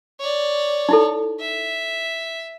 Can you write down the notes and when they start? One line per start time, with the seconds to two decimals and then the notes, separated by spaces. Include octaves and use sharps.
0.20 C#5 D5
0.89 D#4 E4 A4
1.40 E5